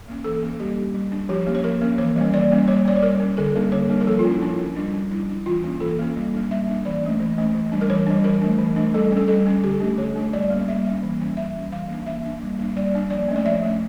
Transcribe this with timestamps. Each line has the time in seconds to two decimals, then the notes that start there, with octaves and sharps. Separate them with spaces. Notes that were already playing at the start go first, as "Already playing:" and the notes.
0.08 A#3 C#4
0.24 E3 A4
0.43 A#3 C#4
0.60 G3 G4
0.77 D4
0.94 G3
1.12 D4
1.29 F3 G4
1.47 A#3 C#4
1.55 C#5
1.64 F3 A#4
1.81 A#3 C#4
1.98 E3 C#5
2.16 G3 A#3 C#4
2.34 E3 D5
2.51 G3 A#3 C#4
2.68 G3 C#5
2.85 C#4 D5
2.96 C#5
3.03 G3 A#4
3.20 C#4
3.37 D3 A#4
3.55 G3 A#3 D4
3.72 D3 C#5
3.89 G3 A#3 D4
4.00 A#4
4.07 F3 A4
4.19 F4
4.25 C#4
4.30 E4
4.42 F3 D4
4.59 C#4
4.76 G3 D4
4.94 D4
5.11 G3 E4
5.30 D4
5.46 E3 F4
5.64 A#3 C#4
5.80 E3 A4
5.99 A#3 C#4
6.16 G3
6.34 A#3 D4
6.51 G3 E5
6.69 A#3 D4
6.85 E3 D5
7.03 A3 C#4
7.20 E3
7.38 A3 C#4
7.55 E3
7.72 G3 D4
7.81 A#4
7.90 E3 C#5
8.07 G3 D4
8.24 E3 A#4
8.41 A3 D4
8.58 E3
8.76 A3 D4
8.94 G3 A4
9.12 C#4 A4
9.28 G3 A4
9.47 C#4
9.63 D3 G4
9.80 A3 D4
9.97 D3 C#5
10.16 A3 D4
10.33 G3 D5
10.50 A#3 C#4
10.68 G3 E5
10.85 A#3 C#4
11.03 E3
11.20 G3 C#4
11.37 E3 E5
11.54 G3 C#4
11.71 E3 F5
11.89 A#3
11.94 D4
12.06 E3 E5
12.23 A#3 D4
12.41 G3
12.59 A#3 D4
12.75 G3 D5
12.94 A#3 D4
13.10 F3 D5
13.28 A3 C#4
13.36 D5
13.45 F3 E5
13.63 A3 C#4